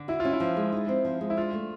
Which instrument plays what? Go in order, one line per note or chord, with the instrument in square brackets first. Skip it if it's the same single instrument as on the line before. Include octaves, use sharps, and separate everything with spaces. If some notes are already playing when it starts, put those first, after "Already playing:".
Already playing: [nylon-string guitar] D3
[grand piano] E4 [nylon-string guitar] F#4
[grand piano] F4
[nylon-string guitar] C#4
[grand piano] E4
[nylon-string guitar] F3
G#3
D#4
C4
F3
G#3
[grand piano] E4
[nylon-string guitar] D4 [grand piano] F4
[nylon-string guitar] A3